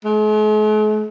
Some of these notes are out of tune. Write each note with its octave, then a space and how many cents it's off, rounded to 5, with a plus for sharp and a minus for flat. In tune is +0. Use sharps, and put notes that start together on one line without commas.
G#3 +45